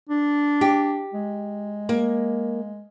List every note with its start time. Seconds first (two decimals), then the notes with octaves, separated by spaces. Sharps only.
0.09 D4
0.61 G4
1.14 G#3
1.89 A#3